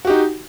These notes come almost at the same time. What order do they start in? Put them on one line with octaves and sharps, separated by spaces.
F#4 G4 D#4